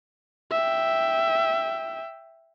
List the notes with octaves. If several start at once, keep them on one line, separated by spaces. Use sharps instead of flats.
E5 G5